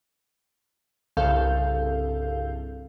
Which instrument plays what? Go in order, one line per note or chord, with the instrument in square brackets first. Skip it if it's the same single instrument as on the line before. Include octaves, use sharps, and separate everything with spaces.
[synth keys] C2 G2 C#3 A4 F5 G6